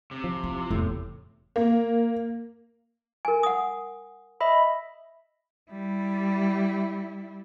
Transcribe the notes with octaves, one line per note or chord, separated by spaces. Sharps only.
C3
F3
E4
F1 E2 A2
A#3
A#4 G#5
F#5 D#6
D#5 E5 B5
G3 E4